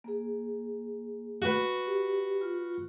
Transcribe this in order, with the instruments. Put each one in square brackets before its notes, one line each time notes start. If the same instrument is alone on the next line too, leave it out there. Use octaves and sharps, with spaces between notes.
[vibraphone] A#3 G#4
[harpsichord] F#4 B4
[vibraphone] G4
F4